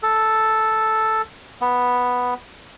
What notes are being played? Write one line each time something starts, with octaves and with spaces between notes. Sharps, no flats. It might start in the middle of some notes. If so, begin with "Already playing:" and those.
A4
B3